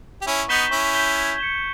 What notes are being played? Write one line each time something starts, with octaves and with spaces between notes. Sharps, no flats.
G4
C#4 E4 C#6
B3 D#4 G6 B6 E7 G7
C#4 E4 C#6
G6 B6 E7 G7
G#6
C#7 E7 G7